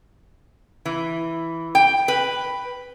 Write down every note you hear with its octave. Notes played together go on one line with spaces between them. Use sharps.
E3
G5
B4